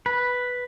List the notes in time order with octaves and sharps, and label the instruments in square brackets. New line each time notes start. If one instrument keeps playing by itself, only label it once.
[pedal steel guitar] B4